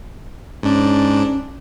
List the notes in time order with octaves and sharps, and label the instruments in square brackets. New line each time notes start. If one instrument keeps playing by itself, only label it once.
[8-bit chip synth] G#2 D4 [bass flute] C#4